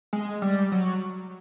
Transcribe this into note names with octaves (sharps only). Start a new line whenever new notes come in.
G#3
G3
F#3